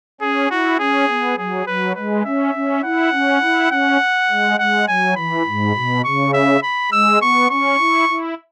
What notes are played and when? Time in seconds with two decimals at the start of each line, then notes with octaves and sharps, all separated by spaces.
0.21 C#4 G#4
0.50 E4 F#4
0.79 C#4 G#4
1.09 B3
1.37 F#3 G#4
1.67 F#3 B4
1.95 G#3 B4
2.25 C#4 E5
2.54 C#4
2.83 E4 F#5
3.12 C#4
3.42 E4
3.71 C#4 F#5
4.29 G#3
4.59 G#3 F#5
4.88 F#3 G#5
5.16 E3 B5
5.46 G#2
5.75 B2
6.04 C#3 C#6
6.34 E5
6.63 B5
6.92 G#3 E6
7.21 B3 C#6
7.50 C#4 C#6
7.79 E4
8.08 E4